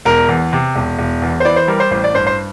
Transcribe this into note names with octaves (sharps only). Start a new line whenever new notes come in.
E1 A#4
E2
C3
E1
E1
E2
C5
E3 D5
C5
G3 A#4
C5
A1 C5
D5
G2 C5
C5